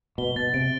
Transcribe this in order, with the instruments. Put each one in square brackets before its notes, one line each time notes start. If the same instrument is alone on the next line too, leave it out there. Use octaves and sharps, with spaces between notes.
[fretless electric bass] B2 [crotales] G7
[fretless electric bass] B2 [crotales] A6
[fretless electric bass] C3 [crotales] D7